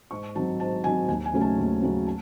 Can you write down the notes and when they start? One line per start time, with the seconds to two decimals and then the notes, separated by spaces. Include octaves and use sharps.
0.11 G#2 C#6
0.35 D#3 F#3 C4 A5
0.60 G#2 A5
0.84 D#3 F#3 C4 G#5
1.08 D#2 G#5
1.26 G#5
1.33 C#3 F#3 A3 C#4
1.41 A5
1.58 D#2
1.82 C#3 F#3 A3 C#4
2.06 A5